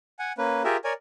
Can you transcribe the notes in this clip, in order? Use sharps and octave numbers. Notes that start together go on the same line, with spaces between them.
F#5 G#5
A#3 C#4 B4
F4 G4 G#4 A#4 E5
A#4 C#5 D5 G#5